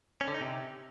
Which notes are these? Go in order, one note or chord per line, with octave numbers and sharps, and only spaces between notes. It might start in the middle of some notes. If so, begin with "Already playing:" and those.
C#4
D3
D#4
C3